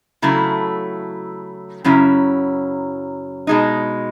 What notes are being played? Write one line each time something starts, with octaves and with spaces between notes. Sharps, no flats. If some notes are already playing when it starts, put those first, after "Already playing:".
C#3 F#3 A3 E4
F#2 C#3 F#3 C#4 E4
B2 G#3 D#4